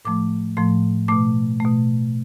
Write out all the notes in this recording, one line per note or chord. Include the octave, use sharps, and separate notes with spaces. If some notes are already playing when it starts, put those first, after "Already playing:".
A2 F3 A3 D6
A2 F3 A3 C6
B2 A3 D6
A3
B2